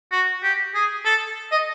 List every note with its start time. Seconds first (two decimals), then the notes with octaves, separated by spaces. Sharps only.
0.12 F#4
0.43 G4
0.75 G#4
1.05 A4
1.52 D#5